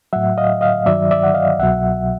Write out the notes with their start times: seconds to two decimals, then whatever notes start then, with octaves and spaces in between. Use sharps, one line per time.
0.13 A2 F#3 E5 F#5
0.38 D#5 F5
0.61 D#5 F5
0.86 G2 D#3 F#3 D5 E5
1.11 D5 E5
1.23 F#5
1.34 D#5 F5
1.59 C2 B2 F#3 E5 F#5